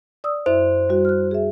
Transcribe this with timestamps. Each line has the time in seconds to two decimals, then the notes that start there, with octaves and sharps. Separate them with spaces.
0.24 D5 D#6 E6
0.46 F#2 E4 C5 E5
0.89 G3 F#4
1.05 F6 F#6
1.31 G#4 E5